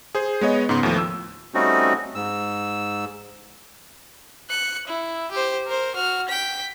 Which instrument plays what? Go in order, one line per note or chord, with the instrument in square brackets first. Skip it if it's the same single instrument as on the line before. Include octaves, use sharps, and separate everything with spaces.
[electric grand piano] G#4 C5
G#3 B3 C#5 D#5
G#2 C#3 B3 C6
D#2 A2 F3
E6
[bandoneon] G3 A3 C4 C#4 D#4 F#4
G#2 E6
[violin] F#6 C#7
E4
G4 C5
A#4 C5
F#4 F6
G5 B6